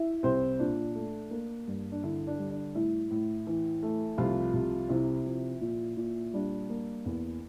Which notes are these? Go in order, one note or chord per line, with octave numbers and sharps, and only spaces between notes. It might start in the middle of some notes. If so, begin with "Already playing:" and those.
Already playing: E4 E5
C2 C4 C5
A#2 D4
A3
A#3
G2
D4
D3 E4
D4
G3
D4
A2 E4
A2
E3
A3
C2 F3 F4
C2
C3 E4
F3
A#2
A#2
G3 D4
A#3
E2